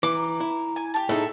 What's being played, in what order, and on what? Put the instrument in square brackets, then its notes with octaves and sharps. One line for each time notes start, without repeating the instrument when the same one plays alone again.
[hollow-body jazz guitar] E3 [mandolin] D6
[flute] A#5
[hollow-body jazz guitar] E4
[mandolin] G#5
G4 A5
[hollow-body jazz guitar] A2 D#4 [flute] G#4 [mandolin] A4 E5